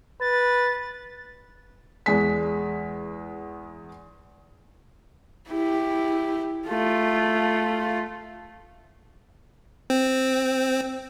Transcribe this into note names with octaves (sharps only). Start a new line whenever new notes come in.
B4 A6
E2 G#3 B6
E4 G4
A3 F4
C4